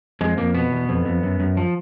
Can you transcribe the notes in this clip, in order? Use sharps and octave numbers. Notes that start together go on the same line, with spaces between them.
F2 G#3
F2 A#3
B2 B3
E2
F2
F2
F#2
F#2
F3